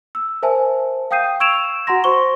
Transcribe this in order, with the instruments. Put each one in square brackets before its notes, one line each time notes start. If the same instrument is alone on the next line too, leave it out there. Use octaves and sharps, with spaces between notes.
[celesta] E6
A#4 C5 E5 G#5 A5
F5 G5 D#6 G6 C7 D#7
C#6 E6 G#6 D7 E7 F7
F#4 F#5 A#5 C6 A#6
F#4 C5 C6 C#6 G7